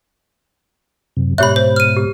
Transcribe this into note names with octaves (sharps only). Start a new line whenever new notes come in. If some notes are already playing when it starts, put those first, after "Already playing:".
F#2 C3
G#2 B2 G4 C#5 E5 B5 F#6
C5
F6 D#7
G4